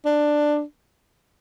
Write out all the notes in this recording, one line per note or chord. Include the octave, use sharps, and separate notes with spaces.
D4